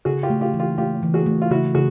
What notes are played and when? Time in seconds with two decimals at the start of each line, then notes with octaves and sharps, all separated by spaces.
0.05 C#3 F#4 G#4
0.23 F4 G4
0.30 A3
0.41 F4 G4
0.54 E3
0.60 F4 G4
0.78 A3 F4 G4
1.03 E3
1.14 F#4 G#4
1.26 A3
1.42 F4
1.51 C#3 E4 F#4
1.75 C#3 F#4 G#4